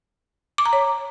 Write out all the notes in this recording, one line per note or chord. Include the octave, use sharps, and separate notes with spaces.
D6
A#5
C#5